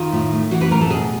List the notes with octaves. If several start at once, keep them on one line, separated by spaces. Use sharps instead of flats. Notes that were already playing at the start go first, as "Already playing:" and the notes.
Already playing: D#3 F4
A2
A3
E3 F#4
B4
A2 A#4
A4
B2 G#4